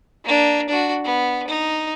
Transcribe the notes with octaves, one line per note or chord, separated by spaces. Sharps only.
A#3 D4
D4 F#4
B3
D#4